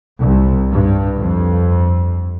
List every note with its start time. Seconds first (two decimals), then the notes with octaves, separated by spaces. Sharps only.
0.20 C2
0.71 G2
1.19 F2